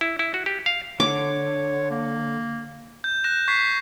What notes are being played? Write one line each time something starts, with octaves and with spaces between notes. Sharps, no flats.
E4
E4
F#4
G4
F5
D3 C#5 D6
A#3
G6
F#6 A#6 E7
C#6 G#6 B6 C7